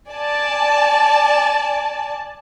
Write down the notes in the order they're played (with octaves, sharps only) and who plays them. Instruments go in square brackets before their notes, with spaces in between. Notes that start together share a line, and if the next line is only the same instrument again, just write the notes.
[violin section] D5 G#5 A5